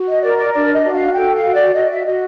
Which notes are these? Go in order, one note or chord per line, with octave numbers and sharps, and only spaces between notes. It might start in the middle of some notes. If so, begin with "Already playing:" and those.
Already playing: F#4
D#5
A#4 D5
D5
D4 D5
D#5
F#4
F5
A4 G5
F5
F#4
D5
F#4 D#5
E5
F#4 D#5